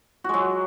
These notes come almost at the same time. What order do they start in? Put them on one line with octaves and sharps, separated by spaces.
F#4 G#3 F#3